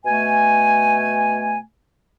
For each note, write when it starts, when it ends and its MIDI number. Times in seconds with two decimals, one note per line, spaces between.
0.06 1.60 47
0.06 1.60 57
0.06 1.60 80